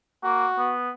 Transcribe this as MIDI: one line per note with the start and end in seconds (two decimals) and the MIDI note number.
0.24 0.46 58
0.24 0.74 66
0.58 0.90 59